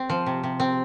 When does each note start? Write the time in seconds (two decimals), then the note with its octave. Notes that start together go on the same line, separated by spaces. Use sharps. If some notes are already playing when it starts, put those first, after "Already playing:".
Already playing: C4
0.09 F3
0.26 C3
0.43 C3
0.60 C4